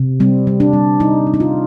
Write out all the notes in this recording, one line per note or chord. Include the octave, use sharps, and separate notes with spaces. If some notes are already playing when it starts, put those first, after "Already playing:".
Already playing: C3
G3 C4
G3
D4
G3
G3 D#4
G3
D#4
F4